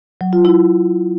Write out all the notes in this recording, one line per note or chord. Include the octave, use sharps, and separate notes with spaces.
F#3
F4
E4